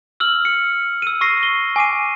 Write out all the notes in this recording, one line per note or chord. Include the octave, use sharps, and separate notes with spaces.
E6 F6 F#7
C#7
E6 D#7
C#6 E6 A#6 C7
G7
G#5 D6 C7 D#7